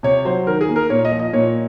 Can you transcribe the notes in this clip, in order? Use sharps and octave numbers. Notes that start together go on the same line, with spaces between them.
C3 C#5
F#3 C5
D#3 A#4
G#4
A#3
A#4
A#2 C#5
D#5
F3
D#5
A#2 C#5